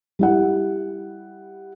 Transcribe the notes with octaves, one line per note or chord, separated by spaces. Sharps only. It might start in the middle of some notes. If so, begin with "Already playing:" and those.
G3 E4 F#5